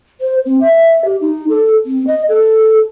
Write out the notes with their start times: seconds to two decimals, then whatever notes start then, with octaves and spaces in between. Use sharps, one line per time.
0.21 C5
0.46 C4
0.61 E5
1.05 G4
1.21 D#4
1.49 A4
1.86 C4
2.07 D#5
2.29 A4